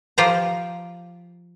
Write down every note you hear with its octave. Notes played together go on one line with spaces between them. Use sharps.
F3 F4 G4 C5 A#5